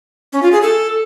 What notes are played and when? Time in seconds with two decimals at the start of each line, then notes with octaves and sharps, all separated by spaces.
0.33 C#4
0.42 F4
0.52 G#4
0.62 A4